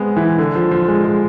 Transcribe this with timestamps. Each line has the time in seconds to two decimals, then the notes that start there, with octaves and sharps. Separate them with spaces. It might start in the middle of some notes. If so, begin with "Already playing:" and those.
Already playing: G#3 B3 C4
0.17 E3
0.38 D3
0.55 F3
0.71 F3
0.88 G#3
1.04 G#3